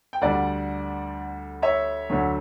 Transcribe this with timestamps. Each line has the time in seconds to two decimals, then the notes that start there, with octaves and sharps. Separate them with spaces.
0.13 G5
0.21 D2 D3 G3 D5 F#5
1.62 C#5 E5
2.10 D2 D3 F#3